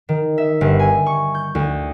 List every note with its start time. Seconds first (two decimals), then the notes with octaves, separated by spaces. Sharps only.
0.09 D#3
0.38 E5
0.61 G1
0.79 G#5
1.06 C#6
1.35 G6
1.55 D2